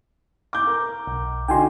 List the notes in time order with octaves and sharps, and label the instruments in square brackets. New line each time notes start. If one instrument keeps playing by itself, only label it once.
[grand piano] D6 G6
A#4
[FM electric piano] B1
[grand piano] D3 D#4 F#4 [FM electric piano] G5 G#5 C6